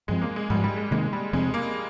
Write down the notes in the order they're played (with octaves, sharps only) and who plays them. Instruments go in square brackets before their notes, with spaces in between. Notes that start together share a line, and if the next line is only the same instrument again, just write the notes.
[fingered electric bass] G2 F3 C4 [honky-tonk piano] G#3
[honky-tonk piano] A#3
G#3
[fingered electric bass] G#2 F3 G#3 [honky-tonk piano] G3
[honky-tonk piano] G3
G#3
[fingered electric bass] C3 D#3 A#3 [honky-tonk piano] G#3
[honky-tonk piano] G3
[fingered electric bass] F2 C3 F3 C4 [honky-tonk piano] G#3
[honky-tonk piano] A#3